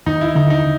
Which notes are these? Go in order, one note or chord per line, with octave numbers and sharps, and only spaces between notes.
D#2 D#4
E4
D3 D#4
D#4